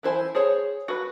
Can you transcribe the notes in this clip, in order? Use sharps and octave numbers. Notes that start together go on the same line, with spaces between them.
E3 E4 C5 G#5
G#4 C5 C#5
F#4 B4